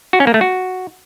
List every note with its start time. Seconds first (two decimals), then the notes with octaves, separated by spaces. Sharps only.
0.13 F#4
0.20 C#4
0.27 A#3
0.34 A3
0.41 F#4